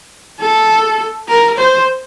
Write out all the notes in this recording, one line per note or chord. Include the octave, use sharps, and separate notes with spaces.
A4
A#4
C5